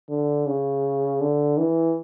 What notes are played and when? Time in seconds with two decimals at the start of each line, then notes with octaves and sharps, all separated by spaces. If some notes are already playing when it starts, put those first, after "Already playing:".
0.09 D3
0.46 C#3
1.21 D3
1.58 E3